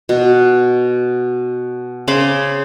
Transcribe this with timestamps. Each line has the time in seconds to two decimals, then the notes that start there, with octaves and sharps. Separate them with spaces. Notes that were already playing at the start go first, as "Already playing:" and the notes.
0.09 B2
2.08 C#3 C5 B5 D6